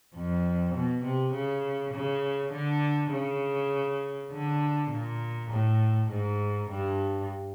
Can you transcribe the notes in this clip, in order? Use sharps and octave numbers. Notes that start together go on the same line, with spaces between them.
F2
B2
C3
C#3
C#3
D3
C#3
D3
A#2
A2
G#2
G2